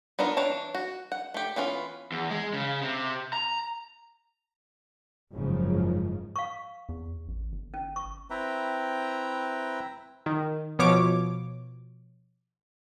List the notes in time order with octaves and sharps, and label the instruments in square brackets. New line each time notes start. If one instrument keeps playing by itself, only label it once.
[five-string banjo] B3 D4 D#4 F4 A#4
E3 D4 C#5 A5
F#4
F#5
A3 G4
E3 B3 C#4 F4
[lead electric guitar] E2
G#3
C#3
C3
A#5
[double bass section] F#1 G#2 C#3 F3 G#3
[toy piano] F5 C#6
[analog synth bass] E2
A1
G1
[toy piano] C#4
C#6
[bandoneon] C4 E4 B4 E5 G5 A#5
[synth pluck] D#3
B2 F3 C#5 D6